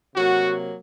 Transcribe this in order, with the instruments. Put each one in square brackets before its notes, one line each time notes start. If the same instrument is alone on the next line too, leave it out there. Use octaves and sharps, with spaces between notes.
[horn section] C3 F#3 A#3 F#4